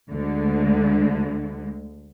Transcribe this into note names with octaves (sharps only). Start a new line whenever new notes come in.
D2 D3 G#3